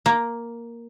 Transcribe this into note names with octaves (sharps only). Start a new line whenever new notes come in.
A#3